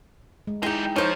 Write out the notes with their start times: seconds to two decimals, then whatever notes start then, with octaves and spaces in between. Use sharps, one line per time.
0.47 G#3
0.63 G#3 D#4 E4 G4 G#4 G5
0.96 F3 D#4 C5 C#5 F5